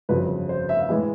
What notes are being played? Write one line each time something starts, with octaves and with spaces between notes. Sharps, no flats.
G1 F2 C#3 F#3 B4
C5
E5
F5
A2 E3 G#3 B3